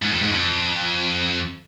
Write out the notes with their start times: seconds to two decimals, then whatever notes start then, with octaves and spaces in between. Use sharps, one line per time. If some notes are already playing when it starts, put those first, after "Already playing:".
0.02 G#2
0.12 F2
0.21 G#2
0.32 F2